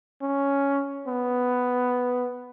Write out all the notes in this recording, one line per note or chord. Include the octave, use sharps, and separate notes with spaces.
C#4
B3